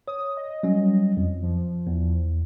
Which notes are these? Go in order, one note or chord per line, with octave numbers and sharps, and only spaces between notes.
C#5 D#6
D#5
F#3 G3 C#4
F2
F3
E2